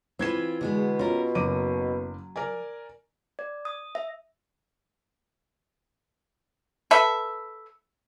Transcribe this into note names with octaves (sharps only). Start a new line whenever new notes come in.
E3 C4 F4 B4 G#6 E7
B2 D3 G#3 B3
C#4 F4 A#4
F#1 F#3 D6 D#7
A#4 D5 G#5
D5
D#6
E5
A4 B4 E5